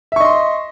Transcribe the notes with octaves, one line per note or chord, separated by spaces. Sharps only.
D#5 E5 C6 C#6